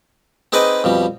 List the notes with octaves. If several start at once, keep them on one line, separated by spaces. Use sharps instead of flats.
C4 D#4 G#4 B4 D5 D#5
F2 B2 G3